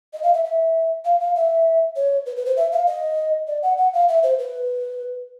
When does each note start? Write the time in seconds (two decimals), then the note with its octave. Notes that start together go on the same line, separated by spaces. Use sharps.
0.13 D#5
0.23 F5
0.34 E5
0.45 E5
1.05 F5
1.20 F5
1.36 E5
1.96 C#5
2.26 B4
2.37 B4
2.46 C5
2.57 E5
2.72 F5
2.87 D#5
3.48 D5
3.62 F#5
3.78 F#5
3.93 F5
4.08 E5
4.23 C5
4.39 B4